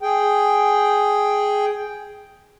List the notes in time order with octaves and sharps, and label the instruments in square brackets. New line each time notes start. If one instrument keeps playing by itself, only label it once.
[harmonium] G#4 G5